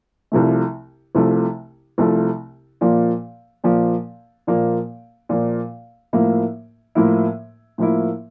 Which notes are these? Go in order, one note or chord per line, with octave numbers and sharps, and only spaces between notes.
C2 C3 F3 A3
C2 C3 F3 A3
C2 C3 F3 A3
A#2 F3 A#3
A#2 F3 A#3
A#2 F3 A#3
A#2 F3 A#3
A2 F3 A#3 E4
A2 F3 A#3 E4
A2 F3 A#3 E4